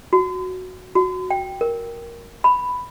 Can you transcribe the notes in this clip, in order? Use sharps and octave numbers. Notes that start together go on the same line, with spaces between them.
F#4
F#4
G5
A#4
B5